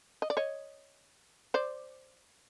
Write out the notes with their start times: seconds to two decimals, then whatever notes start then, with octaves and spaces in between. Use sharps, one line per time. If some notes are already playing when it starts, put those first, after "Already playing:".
0.22 D#5
0.30 D5
0.37 C#5 D#5
1.54 C5 D5